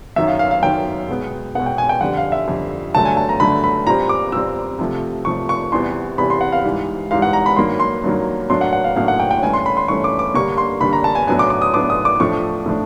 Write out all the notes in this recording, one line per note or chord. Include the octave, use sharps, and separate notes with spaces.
F#2 D#3 F#3 E5
F5
F5
F5
F#2 D#3 F#3 G5
B2 G#3 B3
B2 G#3 B3 F#5
G5
G#5
G5
F2 D3 G3 F#5
F5
E5
F2 D3 G3
G2 D3 F#3 A3 A5
G#5
A5
A#5
G2 D3 F#3 A3 B5
B5
A#2 G3 C4 A#5
D6
A#2 G3 C4 E6
C3 F3 A3
C3 F3 A3 C#6
C#6
E2 C3 E3 G3 B3 C6
E2 C3 E3 G3 B3 B5
C6
F#5
F5
G#2 E3 G3
G#2 E3 G3 F5
F#5
A#5
B5
G2 D#3 F#3 A#3 C6
C6
G2 D#3 F#3 A#3
A2 F#3 A#3 D4 C6
F#5
F#5
F5
A2 F#3 A#3 D4 F5
F#5
G5
G5
G2 E3 A3 C#4 G#5
C6
B5
C6
G2 E3 A3 C#4 C#6
D6
D6
G2 D3 G3 A#3 C#6
C6
G2 D3 G3 A#3 B5
A#5
A5
G#5
A2 F#3 B3 D4 G#5
D6
D6
D#6
A2 F#3 B3 D4 D6
D#6
D6
A2 F3 A3 D4 C#6
A2 F3 A3 D4